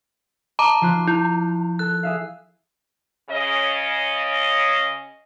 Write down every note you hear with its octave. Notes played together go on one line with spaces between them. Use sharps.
D#5 A5 A#5 D6
F3 F4 F#6
E4
A4 F#6
G#4 E5 F5
C#3 C#4 D#5